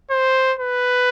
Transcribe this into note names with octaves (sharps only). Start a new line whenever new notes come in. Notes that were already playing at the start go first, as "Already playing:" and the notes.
C5
B4